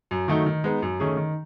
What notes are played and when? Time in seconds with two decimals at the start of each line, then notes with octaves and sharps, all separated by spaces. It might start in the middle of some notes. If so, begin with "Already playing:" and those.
0.11 F#2
0.28 D#3 F#3 A3 D#4
0.46 D#3
0.64 G#3 B3 D#4
0.82 F#2
1.00 D#3 A3 C#4 G#4
1.17 D#3